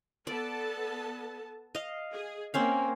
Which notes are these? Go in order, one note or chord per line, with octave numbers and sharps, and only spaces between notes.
B3 A4 D5 A5
D#5 F5
G#4
A#3 C4 C#4 F5